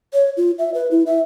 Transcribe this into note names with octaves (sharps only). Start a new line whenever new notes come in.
C#5
F4
E5
B4
E4
E5